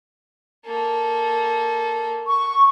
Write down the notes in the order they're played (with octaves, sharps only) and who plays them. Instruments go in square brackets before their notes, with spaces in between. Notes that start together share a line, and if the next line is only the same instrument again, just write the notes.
[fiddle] A#3 A4
[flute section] C#6